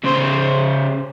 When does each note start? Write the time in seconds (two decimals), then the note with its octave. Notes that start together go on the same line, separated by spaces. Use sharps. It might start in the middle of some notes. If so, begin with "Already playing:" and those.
0.04 C#3 C5